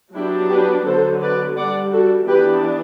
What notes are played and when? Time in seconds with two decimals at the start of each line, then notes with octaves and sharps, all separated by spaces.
0.15 F#3 B3 D4 E4 G4
0.50 G4 B4
0.85 D3 F#3 B3 A4 C5
1.21 B4 D5
1.56 G3 D4 D5 F#5
1.92 F#4 A4
2.27 E3 B3 D4 G4 B4